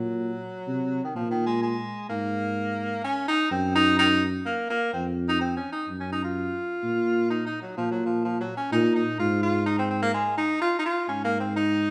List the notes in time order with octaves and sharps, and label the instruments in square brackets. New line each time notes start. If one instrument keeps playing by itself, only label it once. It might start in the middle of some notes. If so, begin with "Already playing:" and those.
Already playing: [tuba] A#2 [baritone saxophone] F#3
[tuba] C3
[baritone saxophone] D#3
[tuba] A#2 [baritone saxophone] F3
[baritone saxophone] D#3
G#3
G#3
[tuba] G#2 [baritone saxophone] A#3
[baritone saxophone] C#4
D#4
[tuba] F#2 [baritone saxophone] C4
[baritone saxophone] D#4
D#4
A#3
A#3
[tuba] F2 [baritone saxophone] C4
[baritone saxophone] D#4
C4
C#4
D#4
[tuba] F#2
[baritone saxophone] C#4
D#4
F4
[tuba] A#2
[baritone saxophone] D#4
D#4
F#3
[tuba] A#2 [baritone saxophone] F3
[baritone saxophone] F#3
F3
F3
F#3
C#4
[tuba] A#2 [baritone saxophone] D#4
[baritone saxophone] D#4
[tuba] G#2 [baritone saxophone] F4
[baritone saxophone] F4
D#4
C4
C4
A#3
G#3
D#4
F4
D#4
F4
[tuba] G#2 [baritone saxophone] C#4
[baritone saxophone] A#3
C4
D#4